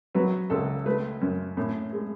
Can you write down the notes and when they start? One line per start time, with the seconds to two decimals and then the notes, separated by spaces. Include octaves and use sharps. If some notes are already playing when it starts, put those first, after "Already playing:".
0.15 F#3 B4
0.50 C#2 A4
0.86 A3 B4
1.21 F#2
1.57 A2
1.93 G#3